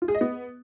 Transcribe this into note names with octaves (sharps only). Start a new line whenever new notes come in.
F4
G#4
D#5
B3